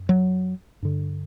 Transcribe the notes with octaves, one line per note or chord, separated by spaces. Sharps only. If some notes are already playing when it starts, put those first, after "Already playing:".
Already playing: F#2
F#3
G2 D3